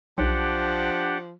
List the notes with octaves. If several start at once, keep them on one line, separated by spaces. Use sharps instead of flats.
B1 F3 D4 G4 F#5